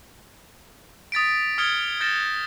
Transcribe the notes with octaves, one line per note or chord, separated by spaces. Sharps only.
D#6 A6 B6 D7
D#6 F6 G#6 C#7 D7 G7
F6 G6 A6 A#6 C#7 E7